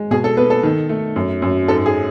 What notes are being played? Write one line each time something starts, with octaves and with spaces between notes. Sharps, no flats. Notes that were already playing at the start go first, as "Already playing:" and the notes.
Already playing: G#3
B2 G#4
A4
B3 B4
A4
D#3
A3
F#2
F#2
G#2 A4
G#4